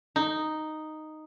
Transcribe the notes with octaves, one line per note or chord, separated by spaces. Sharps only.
D#4